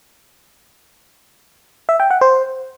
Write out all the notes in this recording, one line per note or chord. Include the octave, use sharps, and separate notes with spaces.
E5
G5
F#5
C5